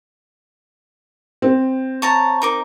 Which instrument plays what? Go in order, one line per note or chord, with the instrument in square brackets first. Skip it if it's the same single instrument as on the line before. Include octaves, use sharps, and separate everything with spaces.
[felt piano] C4
[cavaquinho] C#5 A5 A#5
D#4 A#4 D6